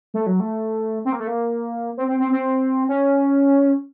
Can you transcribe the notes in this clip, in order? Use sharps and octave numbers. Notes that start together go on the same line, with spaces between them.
A3
F#3
A3
C4
A#3
A3
A#3
C4
C4
C4
C4
C#4